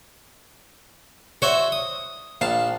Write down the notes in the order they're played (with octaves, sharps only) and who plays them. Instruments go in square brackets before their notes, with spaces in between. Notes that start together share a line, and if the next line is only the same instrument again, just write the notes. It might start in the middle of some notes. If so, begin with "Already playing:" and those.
[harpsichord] F#4 C5 E5 [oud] C#5
[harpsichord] D#6
[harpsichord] A#1 A5 [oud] F5